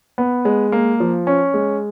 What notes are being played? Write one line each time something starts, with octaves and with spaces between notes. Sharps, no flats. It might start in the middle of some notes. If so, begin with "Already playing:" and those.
B3
G#3
A#3
F3
C#4
G#3